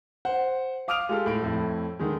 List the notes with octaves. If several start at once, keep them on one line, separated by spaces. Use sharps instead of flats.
C5 F#5
F5 D6 D#6 F6 D7 F7
G#3 F4 G4 A4 F6
A2 D7
F2 A2 E4
D3 D#3 G#3